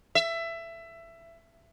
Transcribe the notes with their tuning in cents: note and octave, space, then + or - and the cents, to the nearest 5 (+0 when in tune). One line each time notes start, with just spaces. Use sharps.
E5 +20